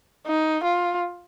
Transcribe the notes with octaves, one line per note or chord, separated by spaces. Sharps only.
D#4
F4